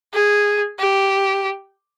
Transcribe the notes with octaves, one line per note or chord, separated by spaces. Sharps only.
G#4
G4